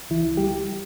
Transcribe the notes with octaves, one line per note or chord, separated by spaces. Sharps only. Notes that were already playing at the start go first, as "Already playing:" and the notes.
C#2 E3 E4
G3 G4